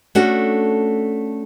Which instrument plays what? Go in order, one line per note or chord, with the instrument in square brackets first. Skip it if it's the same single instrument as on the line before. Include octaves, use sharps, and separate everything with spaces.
[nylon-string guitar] A3 C#4 D4 F#4 A4